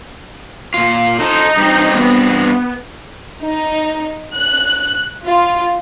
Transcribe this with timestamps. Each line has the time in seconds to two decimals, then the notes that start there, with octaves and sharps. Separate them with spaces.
0.74 A#2 F4
1.20 D#4 A4 C5
1.57 G2 C4
1.97 B3
3.43 D#4
4.38 F#6
5.25 F4